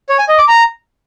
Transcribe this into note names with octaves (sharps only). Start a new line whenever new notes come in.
C#5
G#5
D#5
D6
A#5